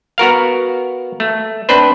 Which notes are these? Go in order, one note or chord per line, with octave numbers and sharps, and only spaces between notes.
B3 F#4 A#4 F5
A3
C4 D4 B4 C5